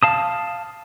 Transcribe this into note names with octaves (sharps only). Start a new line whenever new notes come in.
F5 A5 D#6